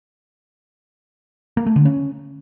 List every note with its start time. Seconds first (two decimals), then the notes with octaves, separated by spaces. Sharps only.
1.57 A#3
1.66 A3
1.76 D3
1.85 C#4